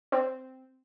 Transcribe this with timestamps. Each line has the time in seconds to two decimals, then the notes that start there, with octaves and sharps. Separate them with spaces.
0.12 C4